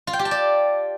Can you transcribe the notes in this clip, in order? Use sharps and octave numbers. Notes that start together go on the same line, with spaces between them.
F4
G5
G4
A5
D5